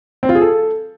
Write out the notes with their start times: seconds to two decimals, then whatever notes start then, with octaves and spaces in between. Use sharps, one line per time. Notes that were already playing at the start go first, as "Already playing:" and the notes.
0.23 C4
0.29 F4
0.35 G#4
0.41 A4